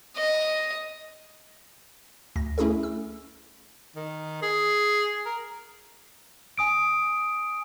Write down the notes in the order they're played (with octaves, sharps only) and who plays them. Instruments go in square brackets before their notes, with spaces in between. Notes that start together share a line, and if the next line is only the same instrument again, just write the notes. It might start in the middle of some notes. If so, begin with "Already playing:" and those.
[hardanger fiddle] D#5
[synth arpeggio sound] D2 A#6
A3 C#4 E4 G#4 A4
E6
[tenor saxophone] D#3
G#4
A#4
[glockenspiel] G#5 D#6 D7